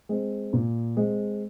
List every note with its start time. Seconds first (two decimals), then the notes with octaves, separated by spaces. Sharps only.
0.09 G#3 C4
0.53 A#2
0.97 G#3 C4